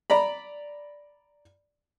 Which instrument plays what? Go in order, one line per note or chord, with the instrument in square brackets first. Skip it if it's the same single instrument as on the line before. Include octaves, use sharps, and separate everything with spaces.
[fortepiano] D5 A#5 B5